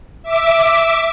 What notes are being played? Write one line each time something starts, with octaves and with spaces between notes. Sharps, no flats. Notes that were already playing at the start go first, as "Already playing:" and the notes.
E5 D6